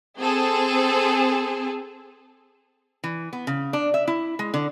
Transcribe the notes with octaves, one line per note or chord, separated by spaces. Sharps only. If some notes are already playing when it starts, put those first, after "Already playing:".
C4 G#4 A4
E3
B3
C#3
D4
E5
E4
G#3
D3